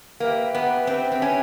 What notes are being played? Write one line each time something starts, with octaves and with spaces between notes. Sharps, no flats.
A#3 G4 B4 E5 G5
B3
C4
C4
C#4